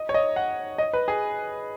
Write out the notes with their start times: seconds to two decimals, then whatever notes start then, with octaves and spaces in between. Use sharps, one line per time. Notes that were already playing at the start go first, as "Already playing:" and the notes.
Already playing: D#5
0.09 C#5
0.14 D#5
0.36 F#5
0.78 D#5
0.93 B4
1.08 G#4